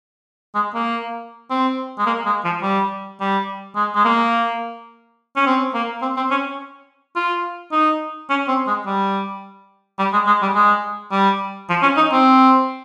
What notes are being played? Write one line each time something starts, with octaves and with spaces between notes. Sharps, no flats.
G#3
A#3
C4
G#3
A#3
G#3
F3
G3
G3
G#3
G#3
A#3
C#4
C4
A#3
C4
C4
C#4
F4
D#4
C#4
C4
G#3
G3
G3
G#3
G#3
G3
G#3
G3
F3
C#4
D#4
C4